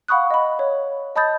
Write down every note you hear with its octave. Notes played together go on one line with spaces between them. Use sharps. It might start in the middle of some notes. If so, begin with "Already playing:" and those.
F5 F#5 B5 C#6 D#6 F#6
D#5 B5
C#5
D#5 A5 B5 D#6 G6 A6